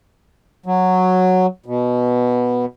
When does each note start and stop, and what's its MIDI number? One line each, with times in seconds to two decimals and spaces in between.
0.66 1.46 54
1.66 2.65 47